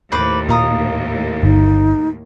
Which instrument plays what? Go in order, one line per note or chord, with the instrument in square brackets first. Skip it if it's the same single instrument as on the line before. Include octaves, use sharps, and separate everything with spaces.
[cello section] D#2 A2 [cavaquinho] B4 C5 D6
[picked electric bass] A#2 [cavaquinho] F5 A#5 D#6
[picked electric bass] G1 [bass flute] D#4